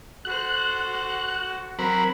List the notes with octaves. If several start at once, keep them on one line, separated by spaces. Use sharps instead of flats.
F#4 A4 C5 F#6
F#3 C4 A#4 B5